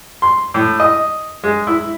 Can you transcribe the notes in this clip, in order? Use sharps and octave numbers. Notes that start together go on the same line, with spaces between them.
C6
A2
D#5
G#3
E4